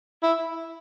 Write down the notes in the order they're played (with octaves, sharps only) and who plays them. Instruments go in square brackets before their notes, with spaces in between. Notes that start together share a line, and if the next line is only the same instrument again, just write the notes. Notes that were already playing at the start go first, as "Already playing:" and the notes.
[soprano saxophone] E4